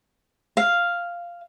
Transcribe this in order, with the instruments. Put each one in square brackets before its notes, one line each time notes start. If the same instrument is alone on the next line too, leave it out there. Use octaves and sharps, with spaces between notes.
[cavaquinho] F5